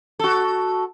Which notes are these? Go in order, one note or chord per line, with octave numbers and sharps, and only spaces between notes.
F#4 A4